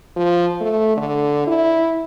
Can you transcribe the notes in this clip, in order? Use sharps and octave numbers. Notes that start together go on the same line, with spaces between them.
F3
A3
D3
E4